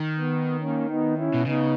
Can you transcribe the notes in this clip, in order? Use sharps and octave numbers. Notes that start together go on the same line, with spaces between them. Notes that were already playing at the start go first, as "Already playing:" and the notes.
Already playing: D#3
B3
A#3 C#4
B3 D#4
C#4 E4
B2
C#3 B3 D#4